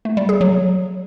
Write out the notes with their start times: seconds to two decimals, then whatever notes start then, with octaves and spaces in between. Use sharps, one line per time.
0.05 A3
0.17 G3
0.29 G#4
0.41 F#3